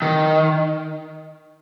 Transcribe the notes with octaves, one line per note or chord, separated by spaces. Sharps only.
D#3